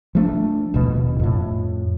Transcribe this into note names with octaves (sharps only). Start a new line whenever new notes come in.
F3 A3 D4
D#1 B2
F2 A2